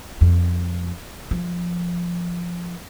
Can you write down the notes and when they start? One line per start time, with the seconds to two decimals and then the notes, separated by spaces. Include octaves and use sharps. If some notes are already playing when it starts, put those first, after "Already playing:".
0.21 F2
1.31 F3